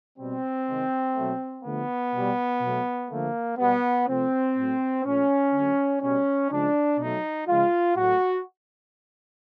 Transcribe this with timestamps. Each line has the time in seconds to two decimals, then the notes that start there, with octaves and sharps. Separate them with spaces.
0.18 B2 G3 C4
0.67 C3 D#3 G#3
1.15 B2 F#3 A3
1.63 D3 F3 A3 B3
2.13 B2 G3
2.61 B2 F#3 A3
3.09 D3 F3 A3 A#3
3.58 B2 G3 B3
4.07 C3 F3 A3 C4
4.56 A2 F#3 A3
5.05 A#2 F3 A3 C#4
5.53 D3 F#3 A3
6.01 B2 G3 C#4
6.50 C#3 F3 G#3 D4
6.98 B2 F#3 A3 D#4
7.47 C#3 F3 G#3 F4
7.96 A2 F#3 A3 F#4